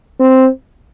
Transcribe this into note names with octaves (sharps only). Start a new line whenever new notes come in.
C4